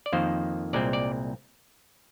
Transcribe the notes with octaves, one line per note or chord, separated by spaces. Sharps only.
D5
F2 D#3 A#3 C5
C2 A#2 G#3 C4 D5
D5